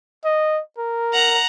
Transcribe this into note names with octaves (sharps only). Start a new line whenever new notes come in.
D#5
A#4
F#5 A#5